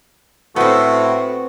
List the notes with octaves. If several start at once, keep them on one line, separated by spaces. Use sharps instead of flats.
A2 B3 C4 F#4